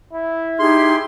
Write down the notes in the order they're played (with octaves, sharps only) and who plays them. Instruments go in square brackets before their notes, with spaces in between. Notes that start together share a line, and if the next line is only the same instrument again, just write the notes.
[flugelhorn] E4
[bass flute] D#4 [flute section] G4 G#4 F6 [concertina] C6